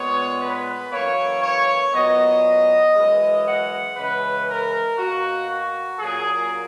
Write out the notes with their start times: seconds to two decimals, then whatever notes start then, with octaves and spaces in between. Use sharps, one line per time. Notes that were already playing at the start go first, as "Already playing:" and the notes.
Already playing: A#2 G#3 B3 C#5
0.41 B4
0.91 F#2 E3 A#3 C#5
1.42 C#5
1.93 A#2 F#3 B3 D#5
2.95 F#2 E3 G#3
3.46 F#5
3.96 C#3 E3 G#3 B4
4.47 A#4
4.98 B2 A#3 F#4
5.49 F#4
5.99 A#2 F#3 A#3 G#4